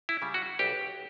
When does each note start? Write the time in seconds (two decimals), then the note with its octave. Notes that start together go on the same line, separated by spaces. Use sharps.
0.09 E4
0.22 C#3 G3
0.34 F#4
0.59 B1 G4